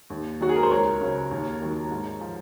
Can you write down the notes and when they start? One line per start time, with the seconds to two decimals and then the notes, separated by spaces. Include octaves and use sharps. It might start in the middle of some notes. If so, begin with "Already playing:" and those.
0.10 D#2
0.41 D#3 F#3 F#4
0.49 G#4
0.56 A#4
0.63 C5
0.70 C#2 A#4 C#5
1.01 C#3 F#3
1.31 D#2
1.62 D#3 F#3
1.91 G#2
2.21 F3